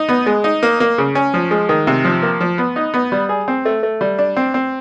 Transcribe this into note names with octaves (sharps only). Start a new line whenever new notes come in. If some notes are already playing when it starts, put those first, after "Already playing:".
Already playing: D#4
B3
G#3
D#4
A#3
A#3
C#3
C#4
F3
G#3
D#3
C3
F3
A#3
F3
B3
D#4
B3
G3
G#4
C4
A3
A3
G3
D4
C4
C4